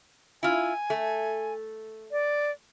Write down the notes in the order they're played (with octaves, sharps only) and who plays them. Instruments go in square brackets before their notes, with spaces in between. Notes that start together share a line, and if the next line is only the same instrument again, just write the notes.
[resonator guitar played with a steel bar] E4 F4 [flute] G#5
[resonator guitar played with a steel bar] A3
[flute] D5